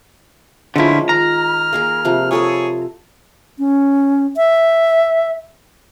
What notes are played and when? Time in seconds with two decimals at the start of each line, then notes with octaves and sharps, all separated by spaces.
0.76 D3 F3 G#3 A#3 C#4 E4 C5
1.09 D#3 A#5 F6
1.73 A#3 G#4 A#4
2.05 C3 F3
2.31 F4 G#4 A4 C#5 G#5
3.59 C#4
4.37 E5